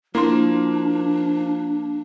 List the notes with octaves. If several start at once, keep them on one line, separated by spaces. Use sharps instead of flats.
F3 A#3 D4 E4 A#5 C6